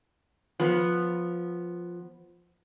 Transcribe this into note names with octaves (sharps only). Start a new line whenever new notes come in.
F3 B3